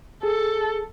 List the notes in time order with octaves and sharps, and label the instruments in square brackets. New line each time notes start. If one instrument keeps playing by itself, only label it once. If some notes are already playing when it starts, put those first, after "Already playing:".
[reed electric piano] G#4 [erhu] A4